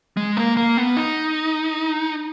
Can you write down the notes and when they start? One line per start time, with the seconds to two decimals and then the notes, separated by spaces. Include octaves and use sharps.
0.17 G#3
0.37 A#3
0.57 A#3
0.77 B3
0.97 D#4